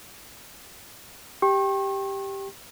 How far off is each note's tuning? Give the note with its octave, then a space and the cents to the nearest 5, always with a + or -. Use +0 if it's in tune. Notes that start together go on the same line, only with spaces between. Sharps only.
G4 +0 G5 +0 C#6 -40